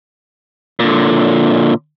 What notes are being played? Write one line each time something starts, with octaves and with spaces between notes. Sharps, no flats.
A#2 D3